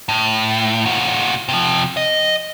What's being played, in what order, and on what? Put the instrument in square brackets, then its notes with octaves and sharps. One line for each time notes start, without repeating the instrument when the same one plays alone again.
[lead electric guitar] A2
A#2 F#4
C3 F3
D#5